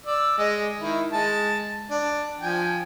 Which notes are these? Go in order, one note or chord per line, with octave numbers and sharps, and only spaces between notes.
D5 E6
G#3 D#5
D#3 E4
G#3 A5
D4
F3 G5 G#5